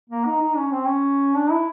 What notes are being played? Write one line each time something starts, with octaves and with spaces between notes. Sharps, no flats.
A#3
D#4
D#4
C#4
C4
C#4
D4
E4